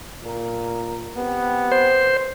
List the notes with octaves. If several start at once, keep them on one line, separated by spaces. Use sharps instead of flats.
A#2 A#4
B3 C4 G4
C5